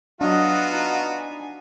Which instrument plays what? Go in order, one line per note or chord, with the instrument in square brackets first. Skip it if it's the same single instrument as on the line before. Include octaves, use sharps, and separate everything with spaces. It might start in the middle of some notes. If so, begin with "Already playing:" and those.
[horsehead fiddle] F#3 D#5 [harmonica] B3 F4 F#4 [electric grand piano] D4
[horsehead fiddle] D#4
G#5